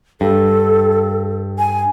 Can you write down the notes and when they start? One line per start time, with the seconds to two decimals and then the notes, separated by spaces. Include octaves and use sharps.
0.21 G2 A4
1.58 G#5